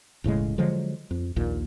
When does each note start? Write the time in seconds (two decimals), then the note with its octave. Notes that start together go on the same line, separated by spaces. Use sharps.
0.24 E1 A2 C#3 G#3
0.58 D3 F3 F#3 G#3
1.11 F2
1.36 A#1 D#2 A#2